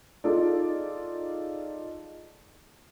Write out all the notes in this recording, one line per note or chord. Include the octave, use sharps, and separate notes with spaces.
D#4 F4 G#4 A4 D5